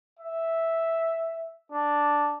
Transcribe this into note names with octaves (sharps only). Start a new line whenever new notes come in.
E5
D4